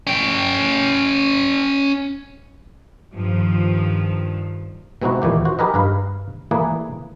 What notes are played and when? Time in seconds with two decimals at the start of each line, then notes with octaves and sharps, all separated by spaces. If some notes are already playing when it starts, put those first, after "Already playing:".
0.07 C#4 G5
3.12 G2 D#3 F3
5.02 B2 G#3 C4 D#4 E4 F#4
5.22 D#2 A#2 E3 G4
5.45 F#4 C5
5.59 D#4 G4 G#4 A#4 B4 D#5
5.74 G2 B4 F5
6.51 E3 A3 A#3 G#4 B4 D5